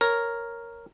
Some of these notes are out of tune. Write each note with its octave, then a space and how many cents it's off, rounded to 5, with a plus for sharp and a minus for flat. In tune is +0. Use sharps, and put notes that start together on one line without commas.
A#4 +0 C#5 +0